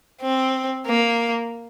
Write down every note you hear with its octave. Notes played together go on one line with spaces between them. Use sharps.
C4
A#3